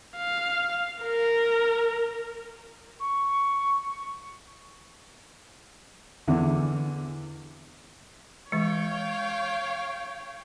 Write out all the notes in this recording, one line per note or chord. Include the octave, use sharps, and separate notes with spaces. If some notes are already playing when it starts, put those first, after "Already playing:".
F5
A#4
C#6
E2 D3 E3
E3 G#3 C#5 F5 G5